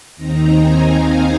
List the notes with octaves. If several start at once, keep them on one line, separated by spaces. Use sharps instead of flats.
D#2 D#3 C4 D#4 A#5
G#5
F5